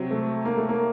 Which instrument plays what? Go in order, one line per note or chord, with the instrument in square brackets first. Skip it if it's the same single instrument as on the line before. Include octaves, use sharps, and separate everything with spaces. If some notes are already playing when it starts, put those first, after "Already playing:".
Already playing: [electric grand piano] C3 F#3 C4
[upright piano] A3
A#3
A3
A#3